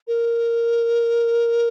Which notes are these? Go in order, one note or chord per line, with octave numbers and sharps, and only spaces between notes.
A#4